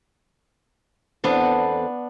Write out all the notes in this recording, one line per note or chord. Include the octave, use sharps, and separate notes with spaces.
E2 B3 C4 D4 A4